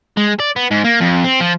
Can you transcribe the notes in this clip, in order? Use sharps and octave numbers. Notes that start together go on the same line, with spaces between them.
G#3
D5
B3
G#2
A#3
F2
C4
F3